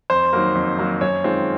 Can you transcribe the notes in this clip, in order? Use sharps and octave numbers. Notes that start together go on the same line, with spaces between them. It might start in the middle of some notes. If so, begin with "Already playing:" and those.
F2 C5
D#3 F#3 A#3
F2
D#3 F#3 A#3
F#2 C#5
D#3 G#3 C4 F4